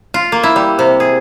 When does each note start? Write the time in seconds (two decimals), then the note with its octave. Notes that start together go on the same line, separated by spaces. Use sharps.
0.14 F4
0.32 A#3
0.43 E4
0.56 G3
0.79 C3
1.00 G#4